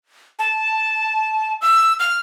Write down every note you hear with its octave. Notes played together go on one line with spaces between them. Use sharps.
A5
E6
F6